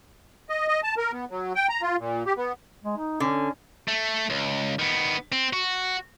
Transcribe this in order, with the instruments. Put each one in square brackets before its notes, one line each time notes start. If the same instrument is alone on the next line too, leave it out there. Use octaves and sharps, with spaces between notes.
[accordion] D#5
D#5
A5
A#4
B3
F#3
G5
A#5
F4
A#2
G4
B3
[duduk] G#3
D#4
[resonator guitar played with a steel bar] D3 [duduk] C#4
[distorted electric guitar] A3
C#2
D#3 B3
C4
F#4